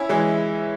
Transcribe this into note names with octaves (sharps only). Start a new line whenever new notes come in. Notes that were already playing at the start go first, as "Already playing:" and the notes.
Already playing: C#4 E4
E3 G#3